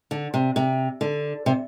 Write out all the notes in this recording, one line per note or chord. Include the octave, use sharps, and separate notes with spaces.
D3
C3
C3
D3
C3